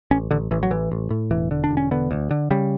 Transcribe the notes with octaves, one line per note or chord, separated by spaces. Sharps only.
A1 C#4
A1 D3
A1 E3
F#3
A1 E3
A1
A2
E1 E3
D3
D4
E1
C#4
D3 B3
D2
D3
C#3 G3